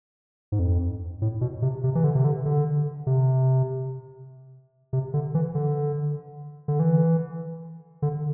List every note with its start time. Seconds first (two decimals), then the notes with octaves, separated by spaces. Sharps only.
0.52 G#2
0.59 F2
1.22 A2
1.41 B2
1.62 C3
1.84 C3
1.95 E3
2.04 D3
2.15 C3
2.24 D3
2.46 D3
3.07 C3
4.93 C3
5.14 D3
5.35 E3
5.55 D3
6.68 D3
6.80 E3
8.02 D3